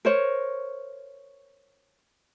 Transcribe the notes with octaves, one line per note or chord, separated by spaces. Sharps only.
A#4 C5 C#5